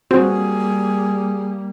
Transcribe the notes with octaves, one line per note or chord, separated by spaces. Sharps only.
G3 A#3 C4 F#4 G#4